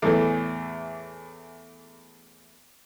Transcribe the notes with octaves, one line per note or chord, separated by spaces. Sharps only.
E2 A2 E3 A3